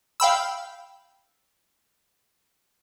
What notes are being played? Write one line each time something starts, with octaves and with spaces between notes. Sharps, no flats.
F5 G5 B5 E6